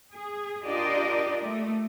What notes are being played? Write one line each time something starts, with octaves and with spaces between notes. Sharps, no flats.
G#4
D4 F4 G4 A#4 D5 D#5
A3